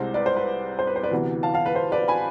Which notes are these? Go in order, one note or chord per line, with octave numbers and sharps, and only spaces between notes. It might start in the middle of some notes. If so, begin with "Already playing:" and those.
Already playing: C2 C3 G#3 C5
B4 D5
C5
B4
C5
B4
C5
B4 D5
D2 C3 E3 B3
F5 A5
F5 A5
B4
C5
B4 D5
G#5 B5